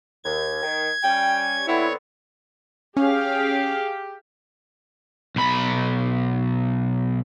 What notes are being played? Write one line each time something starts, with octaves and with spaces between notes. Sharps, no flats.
D#2 G#6
D#3
G3 C#4 G5
D3 B3 C4 E4 C#5
C#4 G4 G#4 F5
B1 B5